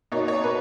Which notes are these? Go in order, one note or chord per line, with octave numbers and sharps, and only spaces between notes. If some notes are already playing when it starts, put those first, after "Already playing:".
B2 A#3 D#4 C#5
C#5
B2 A#3 B4